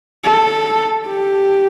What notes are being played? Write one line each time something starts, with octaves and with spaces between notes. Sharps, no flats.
A4
G4